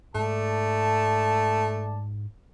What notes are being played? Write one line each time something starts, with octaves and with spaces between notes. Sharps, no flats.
G#2 G#3 A3 D5 A5